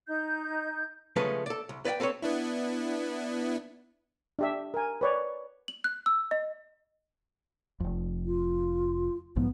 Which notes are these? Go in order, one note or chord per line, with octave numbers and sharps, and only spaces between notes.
D#4 G6
C#3 F3 G#3 A3 C#4 B4
A4 D5
C2
B4 D5 E5 G5
C4 A4 B4 C#5
B3 D4 E4
D4 G4 E5
A#4 G#5
B4 C#5 D5
F#7
F#6
E6
D#5
F1 F2
F4
B1 G#2 F3 B3